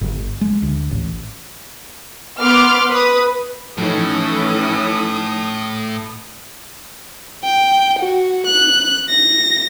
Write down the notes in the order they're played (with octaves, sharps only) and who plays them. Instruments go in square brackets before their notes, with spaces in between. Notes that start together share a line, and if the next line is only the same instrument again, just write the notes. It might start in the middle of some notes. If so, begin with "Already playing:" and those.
[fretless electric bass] G1
G#3
D2
A1
[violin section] B3 C6 D6 F6
B4 D#6
[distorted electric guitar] A2 [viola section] E3 C#4 A4 [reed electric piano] F3 D#4 [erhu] D#6
[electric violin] G5
F#4
F#6
A#6